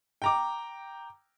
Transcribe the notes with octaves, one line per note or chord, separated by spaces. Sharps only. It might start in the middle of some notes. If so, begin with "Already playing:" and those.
G5 A#5 D6